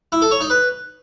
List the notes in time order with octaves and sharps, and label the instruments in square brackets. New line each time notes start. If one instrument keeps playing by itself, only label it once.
[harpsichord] E4
A4
C#5
D#4
B4